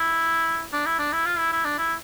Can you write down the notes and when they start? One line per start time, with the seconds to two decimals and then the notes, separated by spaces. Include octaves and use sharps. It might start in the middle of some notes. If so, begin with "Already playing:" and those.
Already playing: E4
0.73 D4
0.86 E4
0.99 D4
1.13 E4
1.26 F4
1.38 E4
1.52 E4
1.65 D4
1.78 E4